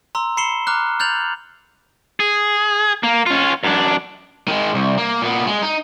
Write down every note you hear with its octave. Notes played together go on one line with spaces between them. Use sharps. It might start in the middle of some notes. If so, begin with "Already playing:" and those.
A#5 C6 E6
B5 C7 C#7 E7 G7
A#5 D6 F6 F#6
F6 G6 A6 F7 F#7
G#4
A#3
C#4 F4
F#2 D4
D#3 G#3
C2
A#3
A#2 B3
G#3
D#4